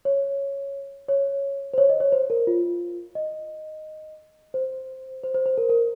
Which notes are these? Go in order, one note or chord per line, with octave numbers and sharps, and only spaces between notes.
C#5
C#5
C5
C#5
D#5
C#5
C5
A#4
F4
D#5
C5
C5
C5
C5
A#4
A#4